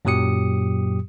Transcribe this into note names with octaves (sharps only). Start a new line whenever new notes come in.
F#2 A#2 F#3 G4 D#6 C#7